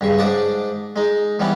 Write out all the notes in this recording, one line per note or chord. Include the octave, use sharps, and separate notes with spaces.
G2 C#3 C#6
G#2 D4 D5 A5 C#6 D#6
G#3 D#4
E3 G3 B3 C#4 E4